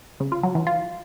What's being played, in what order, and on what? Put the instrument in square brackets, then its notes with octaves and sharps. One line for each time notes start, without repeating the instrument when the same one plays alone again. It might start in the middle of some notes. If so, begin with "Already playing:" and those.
[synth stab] C#3
F4
F#3
E3
F4